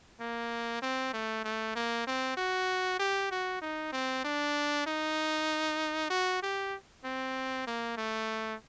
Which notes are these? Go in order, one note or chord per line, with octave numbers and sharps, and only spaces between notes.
A#3
C4
A3
A3
A#3
C4
F#4
G4
F#4
D#4
C4
D4
D#4
F#4
G4
C4
A#3
A3